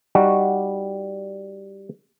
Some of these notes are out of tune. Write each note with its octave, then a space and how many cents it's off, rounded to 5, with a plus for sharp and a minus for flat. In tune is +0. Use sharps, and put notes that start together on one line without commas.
G3 +0 D#4 +0 F#4 +0